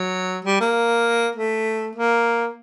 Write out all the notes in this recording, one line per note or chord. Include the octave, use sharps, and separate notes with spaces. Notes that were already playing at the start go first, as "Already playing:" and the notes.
Already playing: F#3
G3
A#3
A3
A#3